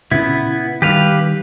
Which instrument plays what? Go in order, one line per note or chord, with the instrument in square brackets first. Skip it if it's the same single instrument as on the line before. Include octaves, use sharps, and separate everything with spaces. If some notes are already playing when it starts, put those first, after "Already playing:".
[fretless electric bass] A#2 C#3 C#4 [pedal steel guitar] B3 E4
[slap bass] D#3 G3 [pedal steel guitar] G4 B4 F5